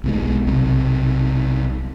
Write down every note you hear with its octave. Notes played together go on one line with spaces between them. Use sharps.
B1 B2 G#3
B1 C3